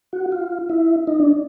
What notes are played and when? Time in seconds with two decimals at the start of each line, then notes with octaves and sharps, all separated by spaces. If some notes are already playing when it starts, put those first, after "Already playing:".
0.13 F#4
0.32 F4
0.70 E4
1.07 D#4
1.20 D4